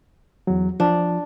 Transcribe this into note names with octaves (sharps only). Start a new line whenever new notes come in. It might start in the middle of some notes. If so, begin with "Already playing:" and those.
E2 F#3
F3 D4